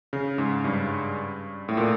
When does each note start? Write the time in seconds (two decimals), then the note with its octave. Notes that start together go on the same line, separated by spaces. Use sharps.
0.13 C#3
0.38 G#2
0.64 G2
1.69 A2
1.77 A#2